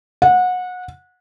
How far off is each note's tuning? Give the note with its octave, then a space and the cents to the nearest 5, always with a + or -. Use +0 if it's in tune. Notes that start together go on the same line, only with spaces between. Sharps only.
F#5 -25